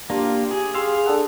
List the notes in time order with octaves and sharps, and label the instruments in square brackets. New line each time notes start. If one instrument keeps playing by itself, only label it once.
[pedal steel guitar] A#3 F4 [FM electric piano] D4 [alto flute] G4
[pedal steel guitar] G#4
[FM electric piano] G4 C6 E6 [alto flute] G#4 [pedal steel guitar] F5
[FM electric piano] D4 A4 F#5